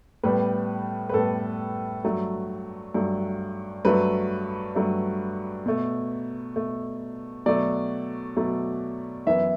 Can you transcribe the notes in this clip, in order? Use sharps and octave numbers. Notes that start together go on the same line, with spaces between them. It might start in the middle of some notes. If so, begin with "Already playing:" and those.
A2 G3 B3 B4
B4
A2 G3 B3 A4
G2 F#3 A3
G2 F#3 A3
G2 F#3 A3 B4
G2 F#3 A3
B2 A3
B2 A3
B2 F#3 A3 D5
B2 F#3 A3
F#2 E3 B3 E5